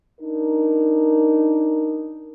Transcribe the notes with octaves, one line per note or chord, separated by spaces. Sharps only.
D4 D#4 A#4